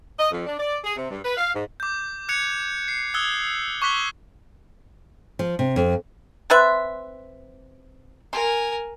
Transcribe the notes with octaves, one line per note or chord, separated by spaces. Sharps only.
D#5
F2
D4
D5
G#4
C3
G2
B4
F5
G#2
D6 G6
F#6 G#6 C#7 F7
C7
D#6 E6 F#6 G#6 G7
C#6 D6 F#6 B6 G7
F3
C3
F2
C4 B4 E5 C6 F#6 A6
A#4 G#5 C6